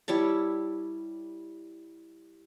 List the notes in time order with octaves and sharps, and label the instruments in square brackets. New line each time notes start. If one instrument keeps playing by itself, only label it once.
[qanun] G3 E4 C#5 A5